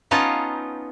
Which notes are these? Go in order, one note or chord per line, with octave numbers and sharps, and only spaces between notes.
B3 C#4 D#4 F4 A5